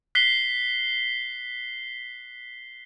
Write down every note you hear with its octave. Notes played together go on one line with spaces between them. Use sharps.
F#6 B6 C7 G7